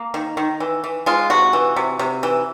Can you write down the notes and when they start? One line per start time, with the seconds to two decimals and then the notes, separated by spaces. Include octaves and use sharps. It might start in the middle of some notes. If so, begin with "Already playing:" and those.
Already playing: A#3
0.14 D#3
0.37 D#3
0.60 E3
0.84 E3
1.06 G#3 F4
1.30 C3 F#4
1.53 E3
1.76 C3
1.99 C3
2.23 E3